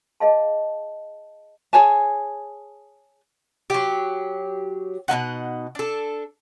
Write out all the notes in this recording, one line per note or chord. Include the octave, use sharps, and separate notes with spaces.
G#4 D#5 F5 A5
G#4 C#5 G#5 A5
F#3 G4
B2 A#3 D#4 F#5
D4 A4